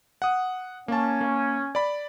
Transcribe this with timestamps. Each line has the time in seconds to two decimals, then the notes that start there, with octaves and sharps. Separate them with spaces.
0.22 F#5 D#6
0.88 A#3 C#4 A5
1.21 A#3
1.75 D5 B5